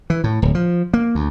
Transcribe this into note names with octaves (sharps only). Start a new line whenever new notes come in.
E3
A2
D1
F3
A#3
D2